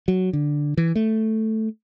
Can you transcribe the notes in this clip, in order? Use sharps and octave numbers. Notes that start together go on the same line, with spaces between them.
F#3
D3
E3
A3